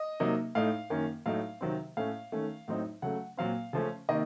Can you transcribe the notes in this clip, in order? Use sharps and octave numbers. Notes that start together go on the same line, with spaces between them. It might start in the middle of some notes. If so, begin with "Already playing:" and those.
Already playing: D#5
C3 F#3 A#3 D#4
A2 A3 D#4 F5
F#2 D#3 A#3 C#4
A2 F#3 A3 D#4 F5
C3 D#3 F#3 C4
A2 A3 C#4 F5
D#3 A3 C#4
A2 F#3 C4 D#4
C#3 F#3 A3 F#5
A#2 F#3 C4 F5
C#3 F3 A3 C#4
C3 D#3 A#3 D#5